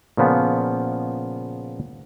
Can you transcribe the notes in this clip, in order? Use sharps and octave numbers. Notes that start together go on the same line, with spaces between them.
A#2 C#3 F3 B3